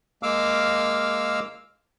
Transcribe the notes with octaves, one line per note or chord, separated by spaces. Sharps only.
G#3 A#3 F5 D6 E6 F6